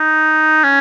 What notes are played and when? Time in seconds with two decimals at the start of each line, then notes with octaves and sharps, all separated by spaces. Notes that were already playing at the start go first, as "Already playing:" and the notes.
Already playing: D#4
0.64 C#4